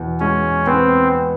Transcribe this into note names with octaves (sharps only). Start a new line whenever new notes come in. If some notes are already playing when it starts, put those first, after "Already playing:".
Already playing: E2 B2
G#3 C#4
B3 C4